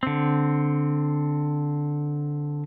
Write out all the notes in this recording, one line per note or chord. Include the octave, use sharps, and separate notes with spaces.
D3 C4